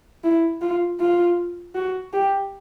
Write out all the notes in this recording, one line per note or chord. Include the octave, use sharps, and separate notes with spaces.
E4
F4
F4
F#4
G4